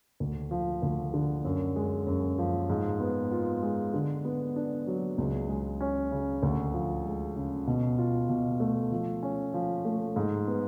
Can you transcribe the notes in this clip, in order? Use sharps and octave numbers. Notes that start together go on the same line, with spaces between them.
D2
F3
D2
D3
F#2
G#3
F#2
F3
G#2
B3
F4
G#3
D3
B3
D4
F#3
C#2
G#3
C#4
C#3
D2
F3
G#3
C#3
B2
F4
B2
A3
F3
C#4
F3
A3
G#2
B3